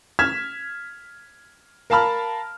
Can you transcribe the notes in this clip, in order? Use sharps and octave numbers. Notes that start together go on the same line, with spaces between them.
F6 G#6 B6 E7
A#4 F5 A5 B5 F6